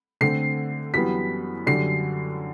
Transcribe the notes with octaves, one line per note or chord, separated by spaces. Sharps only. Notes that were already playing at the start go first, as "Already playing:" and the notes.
D3 A3 C4 C7
F#2 E3 G3 B3 B6
F#2 D3 G3 D4 C7